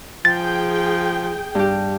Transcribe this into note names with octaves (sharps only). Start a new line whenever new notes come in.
F3 G#4 G5 A6
G2 G4